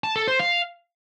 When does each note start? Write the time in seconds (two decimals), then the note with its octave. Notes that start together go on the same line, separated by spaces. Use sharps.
0.04 A5
0.16 A4
0.28 C5
0.39 F5